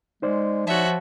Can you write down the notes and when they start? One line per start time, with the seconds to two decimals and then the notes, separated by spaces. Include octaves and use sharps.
0.22 G#3 D#4 C5 D5
0.66 F3 F#4 C#5 E5